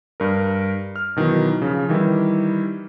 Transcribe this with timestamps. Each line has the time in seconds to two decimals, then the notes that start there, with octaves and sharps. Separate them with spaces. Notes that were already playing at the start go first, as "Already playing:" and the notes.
0.20 G2 A#4
0.96 F6
1.16 B2 D#3 E3 F#3
1.62 C#3 F3
1.89 D#3 E3 G3 E4